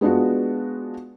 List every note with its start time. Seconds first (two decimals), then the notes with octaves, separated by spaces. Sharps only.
0.01 G#3 B3 D4 F4 F#4